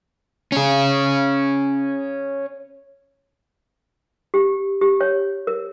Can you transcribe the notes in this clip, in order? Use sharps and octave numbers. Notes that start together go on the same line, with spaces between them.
C#4 G#4
G4
G4
C#5
A#4